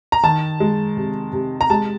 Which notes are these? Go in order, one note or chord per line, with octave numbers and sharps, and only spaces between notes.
A#5
D#3 A5
G#3
C3
C3
A#5
G#3 A5